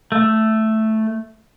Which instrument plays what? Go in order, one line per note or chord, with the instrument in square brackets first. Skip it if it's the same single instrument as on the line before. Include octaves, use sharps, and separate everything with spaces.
[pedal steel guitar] A3